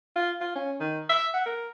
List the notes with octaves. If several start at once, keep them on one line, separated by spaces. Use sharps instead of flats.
F4
F4
C#4
D#3
E5
F#5
A#4